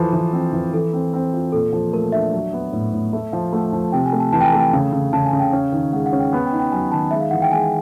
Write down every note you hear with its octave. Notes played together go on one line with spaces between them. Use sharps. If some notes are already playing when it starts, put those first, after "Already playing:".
Already playing: E3 F3 A4
E3
C4
E3
E3 A4
C4
C4
F4
A#2 A4
F3
A3 A#4
D4 E5
F#3
B3
A2
A2
A3 E5
F3 F5
A3 F#5
F3
C3 G5
G#5
A3
A5
E3 A5
G5
G#5
A3
G5
C#3
C#3
C#3 A5
G#5
C#3
G5
C#4
D#3
G#3 F#5
F#5
C#4
G5
B3 G#5
G5
D#4
G5
F#3 G#5
D#3 A5
G#3 E5
F5
E3 F#5
G5
G#3 G#5